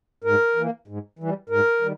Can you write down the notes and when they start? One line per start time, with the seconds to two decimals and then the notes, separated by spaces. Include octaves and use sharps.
0.24 G#2 A#4
0.56 E3 A#3
0.88 G#2
1.19 E3 G3
1.49 G#2 A#4
1.82 D#3 G3